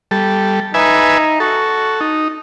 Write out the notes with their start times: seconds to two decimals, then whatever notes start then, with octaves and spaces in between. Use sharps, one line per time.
0.11 G3 A4
0.74 D#4 B4 E5 G#5
1.40 F#4 A4
2.01 D#4